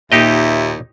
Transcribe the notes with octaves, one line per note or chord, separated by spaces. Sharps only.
D#2 A#2 D#4 G4 D#5 E5